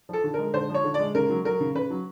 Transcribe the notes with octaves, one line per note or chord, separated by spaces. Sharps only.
F3 A4
D3
G#3 A#4
D3 C5
F3 C#5
D3
D5
G#3
C#3 A#4
F#3
F#3 A#4
C#3
C#3 B4
F#3